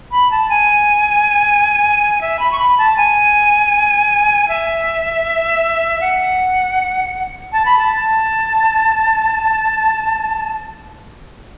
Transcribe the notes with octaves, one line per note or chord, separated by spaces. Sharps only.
B5
A5
G#5
E5
B5
C#6
B5
A5
G#5
E5
F#5
A5
B5
A5